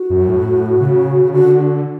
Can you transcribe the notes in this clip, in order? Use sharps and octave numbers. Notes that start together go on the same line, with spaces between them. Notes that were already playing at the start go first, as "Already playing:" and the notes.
Already playing: F#4
F#2
A2
C#3
C#3
D3 F#4